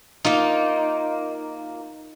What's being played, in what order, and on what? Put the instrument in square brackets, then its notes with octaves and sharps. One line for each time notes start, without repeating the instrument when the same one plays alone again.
[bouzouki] A#3 F4 [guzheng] D#4